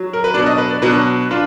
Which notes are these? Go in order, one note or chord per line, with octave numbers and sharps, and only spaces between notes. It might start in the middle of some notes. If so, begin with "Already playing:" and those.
Already playing: F#3
A#4
B4
B2 F#3 D4 D5
D#5
B4
D5
B2 F#3 D4 B4
D4 F4